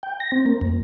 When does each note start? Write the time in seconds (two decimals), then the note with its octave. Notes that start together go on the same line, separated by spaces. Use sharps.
0.03 G5
0.20 A#6
0.32 C4
0.46 A#3
0.61 F2